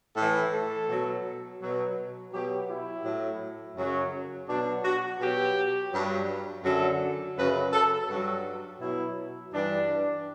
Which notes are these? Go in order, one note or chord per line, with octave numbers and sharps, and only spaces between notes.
A2 E3 A4
A4
B2 F#3
B2 F#3
B2 F#3 G4
E4
A2 F#3
F#2 C#3 F#3
B2 F#3 D4
F#4
B2 F#3 G4
G2 F#3
F#2 D3 F#3 A4
F#2 C#3 F#3 B4
A4
G2 F#3 F#4
B2 F#3 E4
G2 E3 D4